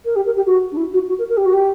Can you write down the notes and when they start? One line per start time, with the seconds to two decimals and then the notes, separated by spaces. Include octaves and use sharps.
0.05 A#4
0.15 G4
0.26 A#4
0.36 G4
0.46 F#4
0.71 D4
0.77 E4
0.93 F#4
1.08 F#4
1.18 A#4
1.29 A#4
1.37 G4
1.45 F#4
1.53 G4